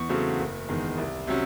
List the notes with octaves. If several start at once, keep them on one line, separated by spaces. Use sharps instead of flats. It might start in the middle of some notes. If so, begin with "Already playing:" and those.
Already playing: E2 C#6
C#3 F#3 A3 C4
F#1
E2 D#3 G#3
C2
C3 F#3 C#4